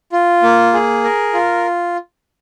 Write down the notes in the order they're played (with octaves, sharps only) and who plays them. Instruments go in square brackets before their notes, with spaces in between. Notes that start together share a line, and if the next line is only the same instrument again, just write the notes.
[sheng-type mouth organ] F4
A#3
G#4
A#4
F4